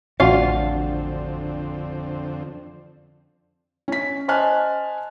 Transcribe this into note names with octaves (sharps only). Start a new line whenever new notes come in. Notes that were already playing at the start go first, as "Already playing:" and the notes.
A1 F2 D3 C4 D4 F4 F#4 F5
C#4 B6
C5 D#5 G#5 A5 F6 F#6